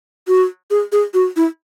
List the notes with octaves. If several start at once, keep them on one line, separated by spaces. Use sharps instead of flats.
F#4
G#4
G#4
F#4
E4